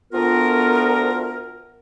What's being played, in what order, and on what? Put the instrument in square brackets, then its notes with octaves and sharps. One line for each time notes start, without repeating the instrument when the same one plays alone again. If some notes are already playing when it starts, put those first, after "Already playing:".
[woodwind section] D2 B3 F4 A#4